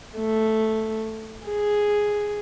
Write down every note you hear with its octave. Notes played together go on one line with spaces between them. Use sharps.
A3
G#4